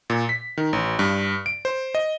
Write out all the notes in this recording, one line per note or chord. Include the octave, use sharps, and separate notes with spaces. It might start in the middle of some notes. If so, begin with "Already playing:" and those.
A#2
B6
D#3
A1
G2
D7
C5
D#5